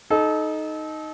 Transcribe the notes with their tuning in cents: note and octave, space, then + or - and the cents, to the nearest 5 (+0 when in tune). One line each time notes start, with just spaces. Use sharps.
D#4 +0 A4 -30